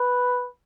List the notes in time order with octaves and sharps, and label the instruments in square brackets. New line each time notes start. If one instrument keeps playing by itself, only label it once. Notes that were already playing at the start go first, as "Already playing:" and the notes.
Already playing: [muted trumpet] B4